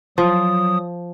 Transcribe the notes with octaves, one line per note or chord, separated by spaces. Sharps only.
F3 F#3 D#6